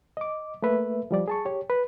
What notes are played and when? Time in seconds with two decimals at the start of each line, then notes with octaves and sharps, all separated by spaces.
0.17 D#5 D6
0.62 A3 A#3 B4 E5
1.11 F3 G3 D5
1.28 G#4 A5 C#6
1.45 G4 C#5
1.70 B4